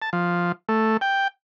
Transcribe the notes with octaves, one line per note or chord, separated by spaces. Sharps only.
A5
F3
A3
G5